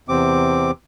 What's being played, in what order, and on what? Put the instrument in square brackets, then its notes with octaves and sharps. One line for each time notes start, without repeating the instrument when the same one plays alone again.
[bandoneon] E2 C3 C4 D6